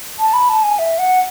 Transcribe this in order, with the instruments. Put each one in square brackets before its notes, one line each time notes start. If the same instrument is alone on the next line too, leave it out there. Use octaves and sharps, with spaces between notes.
[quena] A5
B5
A5
G#5
E5
F#5